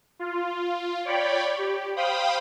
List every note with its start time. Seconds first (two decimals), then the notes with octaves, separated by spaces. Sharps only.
0.19 F4
1.05 C#5 D5 G5 B5
1.57 G4
1.96 C5 F5 G5 B5 D#6